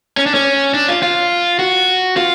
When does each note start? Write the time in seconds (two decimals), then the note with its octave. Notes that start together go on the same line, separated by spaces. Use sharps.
0.17 C#4
0.26 D4
0.34 C#4
0.74 D4
0.89 F4
1.03 F4
1.59 F#4
2.17 F4